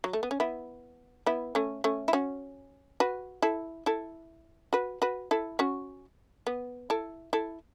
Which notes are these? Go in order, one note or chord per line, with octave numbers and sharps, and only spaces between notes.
F#3
A3
B3
C#4
B3 E4
B3 E4
A3 C#4
A3 C#4
E4
C#4 F#4
F#4 B4
E4 A4
E4 A4
F#4 B4
F#4 B4
E4 A4
C#4 F#4
B3
E4 A4
E4 A4